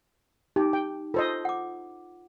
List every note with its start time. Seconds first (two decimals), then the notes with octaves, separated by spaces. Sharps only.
0.56 D#4 G4
0.73 G5
1.14 F4 A4 C5 D#5
1.45 F#5 D6